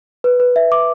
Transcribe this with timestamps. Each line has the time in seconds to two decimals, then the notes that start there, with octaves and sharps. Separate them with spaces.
0.24 B4
0.40 B4
0.56 E5
0.72 D6